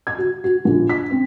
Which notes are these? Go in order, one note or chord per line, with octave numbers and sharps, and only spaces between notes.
G#6
F#4
F#4
A#1
B6
C4